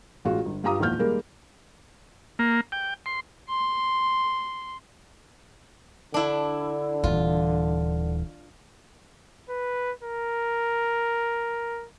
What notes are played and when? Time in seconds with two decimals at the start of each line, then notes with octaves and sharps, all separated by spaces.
0.25 A1 G#3 F4 F#4
0.46 G1
0.64 G2 F4 G4 A#5 D#6
0.79 G#1 E2 A#2 F3 F6 G6
0.99 D#3 G3 G#3 A#3 D#4 A#4
2.39 A#3
2.72 G5
3.06 C6
3.49 C6
6.14 D3 D4 E4
7.04 D#1 E3 F4
9.49 B4
10.03 A#4